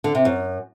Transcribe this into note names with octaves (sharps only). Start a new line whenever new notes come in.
D3
C3
F#2